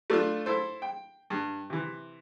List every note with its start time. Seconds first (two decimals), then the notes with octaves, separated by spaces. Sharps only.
0.10 A3 D4 F4
0.46 E4 A4 C5
0.82 G5
1.30 G2
1.70 C3 E3